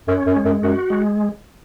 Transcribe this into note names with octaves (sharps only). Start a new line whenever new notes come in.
F#2 C#4
F#2
G#3
F#2
F#2 F#4
G#3